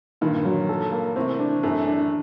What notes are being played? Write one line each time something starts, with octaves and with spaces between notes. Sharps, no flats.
G2 A#2 D#3
F#3
A4
A#3
A2 C3 C5
D4
F#2 A2 A4
D4